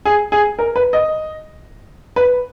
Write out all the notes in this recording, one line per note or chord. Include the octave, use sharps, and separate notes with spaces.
G#4
G#4
A#4
B4
D#5
B4